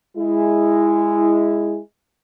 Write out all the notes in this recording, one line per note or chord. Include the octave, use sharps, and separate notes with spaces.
G#3 E4